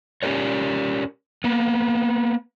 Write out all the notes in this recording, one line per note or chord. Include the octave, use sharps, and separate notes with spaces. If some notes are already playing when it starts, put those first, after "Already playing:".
C#4 G4 G#4 A#4 C#5
A#3 B3